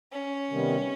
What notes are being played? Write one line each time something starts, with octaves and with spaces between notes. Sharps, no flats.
C#4
C3 D#3 G3 B3